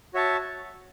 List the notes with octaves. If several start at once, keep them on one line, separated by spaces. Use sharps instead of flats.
F#4 C#5 E5 A5